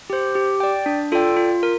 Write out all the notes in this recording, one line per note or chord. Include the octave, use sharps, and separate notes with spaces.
G4 C5
G4
D5 G5
D4
F4 A4 D5 G5
F4
A#4